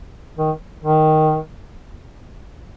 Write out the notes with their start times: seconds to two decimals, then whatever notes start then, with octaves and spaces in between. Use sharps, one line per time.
0.37 D#3
0.84 D#3